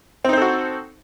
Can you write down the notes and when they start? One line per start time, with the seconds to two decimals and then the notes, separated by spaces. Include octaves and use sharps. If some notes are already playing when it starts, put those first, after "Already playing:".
0.25 C4
0.29 D#4
0.33 C5
0.37 A4
0.42 F#4